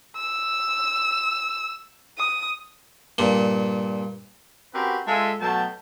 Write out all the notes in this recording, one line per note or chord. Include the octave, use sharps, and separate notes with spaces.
E6
D#6
G2 A#2
C4 C#4 F#4 G4 A#4 B4
G#3 F4 A4 E5 G#5 A5
B2 F#3 A3 G5 A5